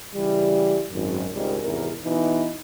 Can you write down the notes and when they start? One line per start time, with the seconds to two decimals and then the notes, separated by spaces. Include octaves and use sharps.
0.15 C#3 E3 G3
0.91 G#1 F#2
1.32 G#1 C#2 G#2 D#3 G3
1.63 G#1 E2 C3 A#4
2.03 B2 E3 B3 D#4